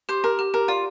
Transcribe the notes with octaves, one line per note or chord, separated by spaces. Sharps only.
G4 C5
G4 A#4
G4
G4 A#4
F4 D5